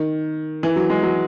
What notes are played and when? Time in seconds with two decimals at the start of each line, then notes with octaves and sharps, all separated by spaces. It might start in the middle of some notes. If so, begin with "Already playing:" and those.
Already playing: D#3
0.63 E3
0.76 F#3
0.90 G#3
1.03 F#3